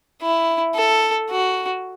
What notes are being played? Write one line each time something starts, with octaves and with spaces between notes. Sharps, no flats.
E4
A4
F#4